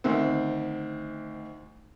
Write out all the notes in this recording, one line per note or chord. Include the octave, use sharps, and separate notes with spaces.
D2 D#3 C4